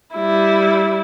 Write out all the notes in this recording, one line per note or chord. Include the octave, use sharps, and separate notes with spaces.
G3 E4